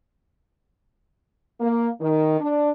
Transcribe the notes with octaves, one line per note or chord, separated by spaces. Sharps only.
A#3
D#3
D4